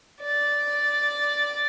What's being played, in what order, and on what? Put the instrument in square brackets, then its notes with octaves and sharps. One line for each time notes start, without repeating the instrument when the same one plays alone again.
[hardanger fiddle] D5